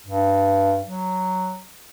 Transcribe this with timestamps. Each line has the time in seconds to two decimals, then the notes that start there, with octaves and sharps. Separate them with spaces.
0.06 G2
0.85 F#3